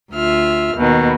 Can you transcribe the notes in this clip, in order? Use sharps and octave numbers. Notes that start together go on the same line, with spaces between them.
D2 F4 E5 F6
D#2 B2 D#3